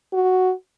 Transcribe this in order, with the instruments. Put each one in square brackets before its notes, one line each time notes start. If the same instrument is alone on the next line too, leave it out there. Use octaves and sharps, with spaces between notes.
[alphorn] F#4